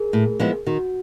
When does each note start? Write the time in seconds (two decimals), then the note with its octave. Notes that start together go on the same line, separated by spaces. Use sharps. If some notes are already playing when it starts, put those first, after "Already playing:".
Already playing: G#4 A#4
0.13 A2
0.40 F3 G#3 B3 E4
0.67 D#3 F#4